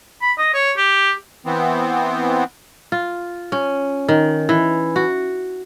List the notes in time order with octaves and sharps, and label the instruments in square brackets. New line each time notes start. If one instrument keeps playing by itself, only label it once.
[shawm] B5
D#5
C#5
G4
[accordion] E3 B3 C4
[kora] F4
C#4
D#3
E3
F#4